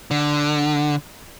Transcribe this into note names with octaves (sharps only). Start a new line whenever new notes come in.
D3